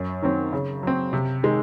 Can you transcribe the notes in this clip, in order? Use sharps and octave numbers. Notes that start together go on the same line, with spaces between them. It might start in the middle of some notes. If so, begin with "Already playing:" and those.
Already playing: F#2
D#3 F#3 C4
C#3
F#3 C4
C3
D#3 G#3